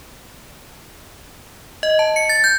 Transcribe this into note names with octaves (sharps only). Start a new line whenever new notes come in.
D#5
A5
C#7
A6
G6